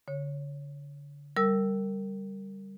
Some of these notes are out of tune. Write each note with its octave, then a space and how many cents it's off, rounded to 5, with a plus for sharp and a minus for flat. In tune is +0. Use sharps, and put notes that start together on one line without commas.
D3 -35 C#5 +0
G3 -5 A#4 -20 E6 +0